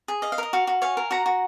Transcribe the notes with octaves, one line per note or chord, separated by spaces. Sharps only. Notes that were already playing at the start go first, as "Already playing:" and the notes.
G#4
D#5 F5
F5
A#4 D#5
F#4 F5
F#4
C#5 F5 G#5
A#4
F#4 F#5 A#5
F#4